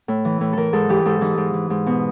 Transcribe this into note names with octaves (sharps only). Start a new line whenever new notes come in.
A2
E3
A2
E3 A4 A#4
G#2 A4
E3 G4
G#2 A4
E3 D#4
G#2
E3
G#2
B2